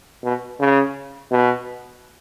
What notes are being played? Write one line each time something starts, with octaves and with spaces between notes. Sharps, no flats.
B2
C#3
B2